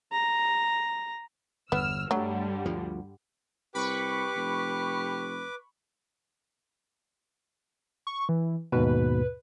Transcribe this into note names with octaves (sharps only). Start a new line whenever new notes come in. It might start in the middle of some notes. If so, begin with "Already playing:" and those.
A#5
G1 E2 B3 E6 F6
G2 D3 F#3 G3 A3
D2 F3
C2 G4 B4 B5 C#6 D6
F1
C#6
E3
D#2 G#2 B2 B4